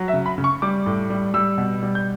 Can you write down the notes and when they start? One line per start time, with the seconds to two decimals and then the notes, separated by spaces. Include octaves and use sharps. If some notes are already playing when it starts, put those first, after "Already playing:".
Already playing: F#3
0.08 E5
0.13 C#3
0.26 B5
0.38 C#3
0.44 C#6
0.62 G3 D6
0.86 A2
1.10 G3
1.34 G3 E6
1.58 B2
1.83 G3
1.95 G6